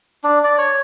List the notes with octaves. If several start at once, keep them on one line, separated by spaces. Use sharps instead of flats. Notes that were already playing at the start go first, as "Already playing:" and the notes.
D4
D5
C#5